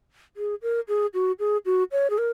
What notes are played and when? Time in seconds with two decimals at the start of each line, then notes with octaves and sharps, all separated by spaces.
0.37 G#4
0.62 A#4
0.88 G#4
1.14 F#4
1.39 G#4
1.65 F#4
1.92 C#5
2.10 G#4
2.18 A#4